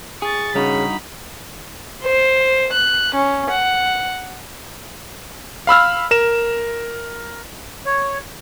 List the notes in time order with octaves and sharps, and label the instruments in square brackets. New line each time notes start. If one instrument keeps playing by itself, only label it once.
[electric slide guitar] G#4 [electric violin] C#6 A6
[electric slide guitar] G2 D#4 F#4 [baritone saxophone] C#3 [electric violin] B5
[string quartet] C5
F#6
C#4
F#5
[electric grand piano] F5 B5 E6 F6
A#4 E7
[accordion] C#5